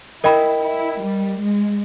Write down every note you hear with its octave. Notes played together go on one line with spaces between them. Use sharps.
E4 A#4 D#5 G5 B5
E4
G3
G#3